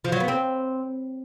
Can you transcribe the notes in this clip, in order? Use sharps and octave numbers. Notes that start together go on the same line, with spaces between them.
F3
F#3
B3
C4